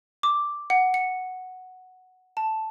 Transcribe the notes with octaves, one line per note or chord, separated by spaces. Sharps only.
D6
F#5
C#7
A5